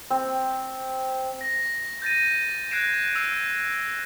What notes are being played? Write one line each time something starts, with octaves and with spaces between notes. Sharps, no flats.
C4
A#6
G6 A6 A#6 D#7
F#6 G#6 A#6 C7 D7 E7
E6 C7 F7